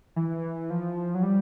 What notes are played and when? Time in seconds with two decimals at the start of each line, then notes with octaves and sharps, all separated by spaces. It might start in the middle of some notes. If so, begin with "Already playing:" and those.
0.16 E3
0.70 F3
1.15 F#3
1.23 G3